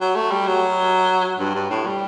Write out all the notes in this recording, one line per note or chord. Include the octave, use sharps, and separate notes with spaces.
F#3
A3
G3
F#3
G2
G2
A2
G3